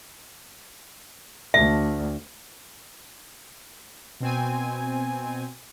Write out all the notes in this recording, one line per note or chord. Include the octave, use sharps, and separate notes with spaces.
D2 E5
B2 C4 G#5